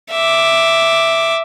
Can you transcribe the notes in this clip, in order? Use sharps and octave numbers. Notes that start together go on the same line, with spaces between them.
E5 D6